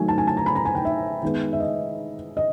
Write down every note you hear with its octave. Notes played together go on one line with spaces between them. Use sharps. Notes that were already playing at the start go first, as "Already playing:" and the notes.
Already playing: D#3 F#3 A3 G#5
A5
G#5
A5
A#5
B5
A#5
G#5
G5
E5
D#3 G#3 B3
E5
D#5
D#5